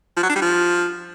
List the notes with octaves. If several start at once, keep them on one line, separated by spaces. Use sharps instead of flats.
F3
F#3
D4
G3
F3